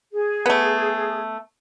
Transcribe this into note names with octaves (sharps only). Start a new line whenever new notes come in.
G#4
A3 B3